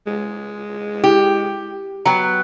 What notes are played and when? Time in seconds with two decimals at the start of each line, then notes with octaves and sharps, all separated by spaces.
0.07 G#3
1.04 E4 G4
2.06 F#3 B3 G5 A#5